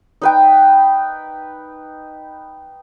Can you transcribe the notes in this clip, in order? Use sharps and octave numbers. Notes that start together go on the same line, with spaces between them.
D#4 B4 G5